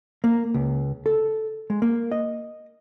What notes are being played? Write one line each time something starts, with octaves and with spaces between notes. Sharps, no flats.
A#3
C#2
A4
G#3
A#3
D#5